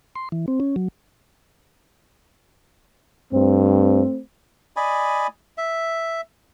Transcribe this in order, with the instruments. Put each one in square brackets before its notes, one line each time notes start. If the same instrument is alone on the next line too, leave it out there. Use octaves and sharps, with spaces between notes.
[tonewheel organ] C6
E3
C4
C#4
F#3
[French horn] G2 [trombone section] A3 C4
[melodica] D5 D#5 G#5 B5
E5